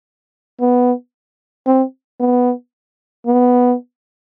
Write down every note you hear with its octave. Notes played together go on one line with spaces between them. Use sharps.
B3
C4
B3
B3